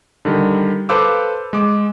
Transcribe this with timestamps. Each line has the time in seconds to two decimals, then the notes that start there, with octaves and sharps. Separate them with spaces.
0.25 D3 D#3 G3
0.89 A4 B4 C5 F5 D6 E6
1.53 G#3 D6